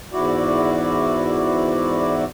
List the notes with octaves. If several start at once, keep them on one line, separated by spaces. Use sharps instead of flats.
E2 G#2 E4 F#4 D5